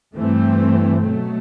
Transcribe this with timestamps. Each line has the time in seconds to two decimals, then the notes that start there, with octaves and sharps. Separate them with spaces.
0.15 G2 E3 A3 C4
0.99 B2 F#3 A3